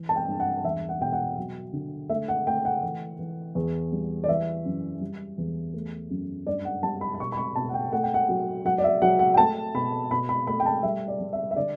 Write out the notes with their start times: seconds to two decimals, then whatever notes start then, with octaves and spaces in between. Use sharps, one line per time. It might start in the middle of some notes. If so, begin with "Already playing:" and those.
Already playing: E3
0.09 A5
0.16 G5
0.28 G2
0.40 F#5
0.65 E2 E5
0.89 F#5
1.01 B2 G5
1.13 F#5
1.37 F#3
1.73 D3
2.10 A3 E5
2.28 F#5
2.47 A3 G5
2.65 F#5
2.83 E3
3.19 E3
3.55 E2
3.92 G3
4.24 D5
4.28 E3 E5
4.65 F#2
5.01 G3
5.38 E2
5.74 A3
6.10 F#2
6.47 G2 D5
6.65 F#5
6.83 G3 A5
7.01 B5
7.14 B5
7.20 B2 C#6
7.32 B5
7.37 C#6
7.55 B2 A5
7.69 F#5
7.74 G5
7.93 A3 F#5
8.03 G5
8.14 F#5
8.29 F#3
8.65 F#3 F#5
8.78 D5
8.84 E5
9.02 F#3 F#5
9.19 F#5
9.34 G5
9.37 A3 A5
9.74 B2 B5
10.11 B2 B5
10.29 B5
10.47 A3 B5
10.60 G5
10.66 A5
10.83 G3 E5
11.08 D5
11.21 G3
11.33 E5
11.51 E5
11.56 D3 D5